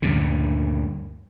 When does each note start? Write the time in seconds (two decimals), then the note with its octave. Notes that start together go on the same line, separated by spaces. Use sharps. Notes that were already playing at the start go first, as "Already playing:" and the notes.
0.02 D2 G2 A#2 C#3